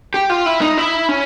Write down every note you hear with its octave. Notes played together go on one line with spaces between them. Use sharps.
G4
F4
E4
D#4
E4
C#4